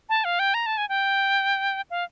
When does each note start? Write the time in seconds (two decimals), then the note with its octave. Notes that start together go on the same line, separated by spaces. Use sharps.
0.09 A5
0.25 F5
0.39 G5
0.54 A#5
0.66 A5
0.78 G#5
0.89 G5
1.90 F5